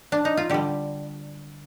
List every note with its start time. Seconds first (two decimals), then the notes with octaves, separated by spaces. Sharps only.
0.12 D4
0.25 D#4
0.37 F4
0.50 D3 G3 G4